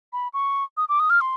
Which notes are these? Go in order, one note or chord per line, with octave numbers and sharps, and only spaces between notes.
B5
C#6
D#6
D6
D#6
F6
C6